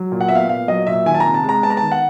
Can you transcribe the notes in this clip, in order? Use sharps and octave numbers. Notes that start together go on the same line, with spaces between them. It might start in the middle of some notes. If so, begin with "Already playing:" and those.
Already playing: F#3
A#2
F#5
B3 E5
F5
A#2 F5
F#3 D#5
A#2 E5
D#3 G#5
A5
A#5
C3
A5
G#3
A#5
B3 A5
A#5
D#3 A5
F#5